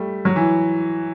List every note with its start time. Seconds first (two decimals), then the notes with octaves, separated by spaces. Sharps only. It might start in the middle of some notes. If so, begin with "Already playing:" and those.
Already playing: G3 A3
0.25 F#3
0.36 E3